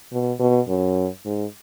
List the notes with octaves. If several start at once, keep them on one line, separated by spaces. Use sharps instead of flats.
B2
B2
F#2
G#2